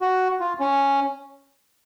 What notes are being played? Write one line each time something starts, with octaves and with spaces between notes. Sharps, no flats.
F#4
F4
C#4